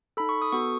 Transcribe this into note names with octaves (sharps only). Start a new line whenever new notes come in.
D#4 A4 B5
C#6
D#6
B3 F#4 A4 C#6